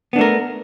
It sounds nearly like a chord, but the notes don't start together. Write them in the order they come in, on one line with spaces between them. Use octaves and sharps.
B3 D4 A3 A#4